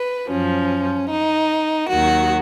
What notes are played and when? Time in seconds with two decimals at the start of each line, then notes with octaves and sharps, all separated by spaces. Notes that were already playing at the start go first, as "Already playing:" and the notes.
Already playing: B4
0.30 F#2 F3 C#4
1.10 D#4
1.89 D#2 D#3 F#3 F#4